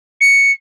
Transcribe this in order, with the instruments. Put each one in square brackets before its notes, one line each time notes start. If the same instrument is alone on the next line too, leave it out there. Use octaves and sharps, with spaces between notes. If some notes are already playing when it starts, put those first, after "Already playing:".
[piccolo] C#7